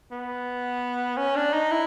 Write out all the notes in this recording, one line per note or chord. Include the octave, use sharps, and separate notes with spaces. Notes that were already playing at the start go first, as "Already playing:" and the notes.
B3
C#4
D4
D#4
E4